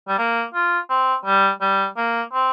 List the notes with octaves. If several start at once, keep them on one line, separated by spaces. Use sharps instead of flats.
G3
A#3
F4
C4
G3
G3
A#3
C4